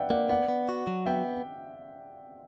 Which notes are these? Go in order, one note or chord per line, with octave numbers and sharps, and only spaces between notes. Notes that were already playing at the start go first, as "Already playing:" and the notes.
Already playing: B4 D5 E5 F#5 G5
A#3 D5 F#5
B3 D5 F#5
B3
F#4
F#3
B3 E5 G5